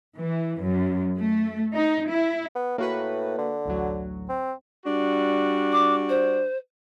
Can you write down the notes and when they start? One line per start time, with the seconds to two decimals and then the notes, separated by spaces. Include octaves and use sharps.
0.17 E3
0.61 F#2
1.17 A3
1.74 D#4
2.08 E4
2.55 B3
2.78 A2 A#3 F#4 B4
3.38 D3
3.65 A1 D2 F#3
4.29 C4
4.86 G3 D4 F#4
5.72 D6
6.09 C5